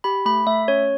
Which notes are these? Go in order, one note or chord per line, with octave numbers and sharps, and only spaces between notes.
G4 B5
A3 B5
A3 E5
C#4 C#5